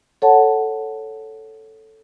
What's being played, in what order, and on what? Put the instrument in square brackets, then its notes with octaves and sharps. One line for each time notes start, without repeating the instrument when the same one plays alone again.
[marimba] A4 C#5 F#5 A5